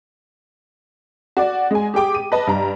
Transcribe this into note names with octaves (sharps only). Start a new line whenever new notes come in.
F#4 D5 F#5
G#3 G#5
G4 G#4 G5 D6
D#7
B4 D#5 A5
G2 A#5